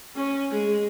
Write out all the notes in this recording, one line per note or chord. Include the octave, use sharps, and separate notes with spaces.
C#4
G#3